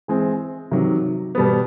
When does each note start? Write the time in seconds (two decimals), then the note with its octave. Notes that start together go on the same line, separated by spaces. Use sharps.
0.08 E3 G#3 C4
0.72 C3 D#3 F#3
1.35 B2 G3 B3